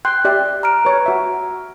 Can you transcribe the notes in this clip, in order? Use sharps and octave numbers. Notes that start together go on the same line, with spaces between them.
G5 C6 F#6
G4 D5 E5
A#5 F6 D7
B4 C#5
F#4 E5